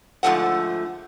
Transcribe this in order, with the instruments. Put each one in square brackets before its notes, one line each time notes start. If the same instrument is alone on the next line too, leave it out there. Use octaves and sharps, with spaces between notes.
[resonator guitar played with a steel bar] G#2 D3 E3 F3 A3 F#5